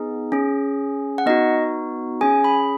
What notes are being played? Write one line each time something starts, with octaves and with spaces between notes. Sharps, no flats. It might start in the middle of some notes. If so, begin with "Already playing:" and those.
Already playing: B3 D#4 G#4
C#4 G#4
F#5
B3 D#4 F#4 D#5
C#4 G#4 G#5
B5